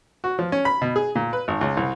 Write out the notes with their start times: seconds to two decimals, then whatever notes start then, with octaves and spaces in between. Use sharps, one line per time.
0.24 F#4
0.39 F3
0.52 C#4
0.65 B5
0.82 B2
0.96 G#4
1.15 A#2
1.33 B4
1.48 G#1
1.61 C#2
1.77 C2